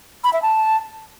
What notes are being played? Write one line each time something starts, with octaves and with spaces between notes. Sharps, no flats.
B5
E5
A5